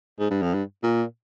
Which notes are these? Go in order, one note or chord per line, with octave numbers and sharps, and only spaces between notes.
G#2
G2
F2
G2
A#2